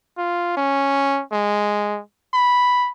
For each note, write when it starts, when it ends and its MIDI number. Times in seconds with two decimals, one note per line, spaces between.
0.18 0.57 65
0.57 1.21 61
1.32 2.00 56
2.34 2.90 83